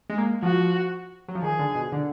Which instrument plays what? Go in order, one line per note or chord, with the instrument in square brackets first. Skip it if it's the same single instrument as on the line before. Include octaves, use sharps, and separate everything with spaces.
[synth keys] G#3
A#3
[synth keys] F3 [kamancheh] F#4
[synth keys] F#3
F3
[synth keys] D#3 [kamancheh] G#4
[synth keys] D3
B2
D3